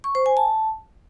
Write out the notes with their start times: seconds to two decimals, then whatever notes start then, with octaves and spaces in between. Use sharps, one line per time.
0.04 C#6
0.15 C5
0.26 G#5
0.37 A5